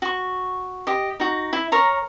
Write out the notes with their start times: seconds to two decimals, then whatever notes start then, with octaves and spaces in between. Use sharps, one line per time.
0.02 F#4 C#6
0.87 G4 D#5
1.20 D#4 F#4
1.53 E4
1.72 A#4 C#5 A#5